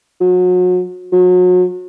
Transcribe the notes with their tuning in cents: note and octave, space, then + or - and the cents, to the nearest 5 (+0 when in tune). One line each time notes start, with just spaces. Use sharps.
F#3 -35
F#3 -35